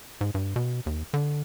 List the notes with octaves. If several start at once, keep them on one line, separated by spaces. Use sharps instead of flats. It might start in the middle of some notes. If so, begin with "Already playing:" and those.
G#2
G2
B2
D#2
D3